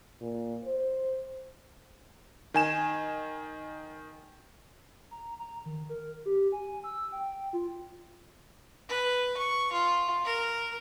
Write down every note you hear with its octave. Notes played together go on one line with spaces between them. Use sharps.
A#2
C5
D#3 G#5 E7
A#5
A#5
D#3
A#4
G4
G#5
E6
G5
F4
B4
C#6
F4
A#4